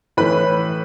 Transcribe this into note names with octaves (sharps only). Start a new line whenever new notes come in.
A2 E3 B4 B5